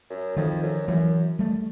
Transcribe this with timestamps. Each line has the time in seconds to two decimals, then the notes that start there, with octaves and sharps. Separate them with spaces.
0.10 F#2
0.37 F2 D#3 F3
0.63 F#2
0.87 F#2 E3 F#3
1.39 G3 A3